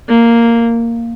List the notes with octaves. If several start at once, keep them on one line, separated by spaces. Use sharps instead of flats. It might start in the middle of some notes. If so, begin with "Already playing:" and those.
A#3